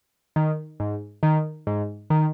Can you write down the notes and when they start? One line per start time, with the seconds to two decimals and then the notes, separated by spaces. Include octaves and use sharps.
0.36 D#3
0.80 G#2
1.23 D#3
1.67 G#2
2.10 D#3